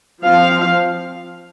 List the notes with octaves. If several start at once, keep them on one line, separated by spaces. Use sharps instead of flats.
F3 C4 F5